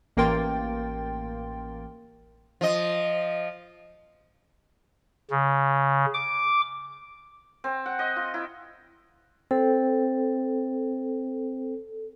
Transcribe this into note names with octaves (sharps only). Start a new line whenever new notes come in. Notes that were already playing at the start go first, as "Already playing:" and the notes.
A1 A#3 A#4 G5 C6 A6
F3 D#5
C#3
D6
C4
F#5
D#5
F4
E4
C4 A4